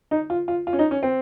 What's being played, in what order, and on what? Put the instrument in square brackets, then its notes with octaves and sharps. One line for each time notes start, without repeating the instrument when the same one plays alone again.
[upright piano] D#4
F4
F4
F4
C#4
D#4
C#4
C4